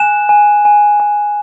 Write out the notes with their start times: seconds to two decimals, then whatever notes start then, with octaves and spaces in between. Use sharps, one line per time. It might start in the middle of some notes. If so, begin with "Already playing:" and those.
Already playing: G#5 F#6 E7
0.29 G#5
0.65 G#5
1.00 G#5